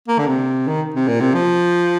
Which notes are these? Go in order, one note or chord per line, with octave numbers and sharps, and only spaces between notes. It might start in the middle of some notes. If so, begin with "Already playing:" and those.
A#3
D3
C3
D#3
C3
A#2
C3
F3